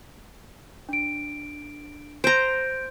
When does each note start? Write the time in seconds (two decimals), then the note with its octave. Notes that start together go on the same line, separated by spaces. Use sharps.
0.89 D4 D7
2.24 C5 A#5 G6 D7